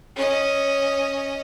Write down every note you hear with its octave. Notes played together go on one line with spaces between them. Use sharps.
C#4 D#5